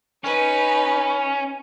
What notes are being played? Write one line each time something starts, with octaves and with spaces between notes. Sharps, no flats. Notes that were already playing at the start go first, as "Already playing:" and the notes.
C#4 D#4 B4